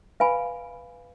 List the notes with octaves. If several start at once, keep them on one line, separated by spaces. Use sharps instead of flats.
B4 F5 G#5 B5